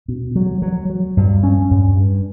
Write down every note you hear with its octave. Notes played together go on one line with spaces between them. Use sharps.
B2
F#3
F#3
F#3
G2
C#4
G2
G2